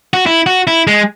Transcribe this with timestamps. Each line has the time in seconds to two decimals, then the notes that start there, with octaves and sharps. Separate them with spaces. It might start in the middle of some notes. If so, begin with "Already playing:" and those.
0.13 F#4
0.26 E4
0.46 F#4
0.67 E4
0.87 G#3